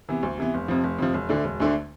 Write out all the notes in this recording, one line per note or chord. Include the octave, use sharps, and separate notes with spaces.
C3 E3 B3
D2
C3 E3 B3
F1
F2 C3 F3
F1
F2 C3 F3
E1
D2 D3 A3 D4
E1
D2 D3 A3 D4